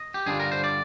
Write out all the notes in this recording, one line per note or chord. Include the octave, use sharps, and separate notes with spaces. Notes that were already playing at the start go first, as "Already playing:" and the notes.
Already playing: D#5
G4
G2 D3 G3 D4 F4 G#4
A#4
C5
D5